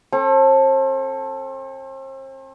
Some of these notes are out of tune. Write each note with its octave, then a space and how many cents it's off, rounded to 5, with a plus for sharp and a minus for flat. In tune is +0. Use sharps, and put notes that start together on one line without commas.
C4 +40 A4 +0